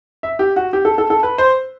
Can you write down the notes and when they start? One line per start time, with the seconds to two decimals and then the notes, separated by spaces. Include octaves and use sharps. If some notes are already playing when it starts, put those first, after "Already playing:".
0.23 E5
0.39 G4
0.56 F#4
0.73 G4
0.85 A4
0.98 A4
1.10 A4
1.23 B4
1.38 C5